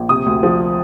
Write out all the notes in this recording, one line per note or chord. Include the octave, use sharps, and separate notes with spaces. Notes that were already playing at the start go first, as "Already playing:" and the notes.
Already playing: A#1
C3 D#6
D2
F3